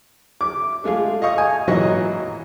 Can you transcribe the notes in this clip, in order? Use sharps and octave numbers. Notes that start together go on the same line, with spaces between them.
D6
G#3 A3 F4 G#4
D#5 F5 C#6 D#6
G#5
G#1 A#2 E3 F#3 D#5 C#6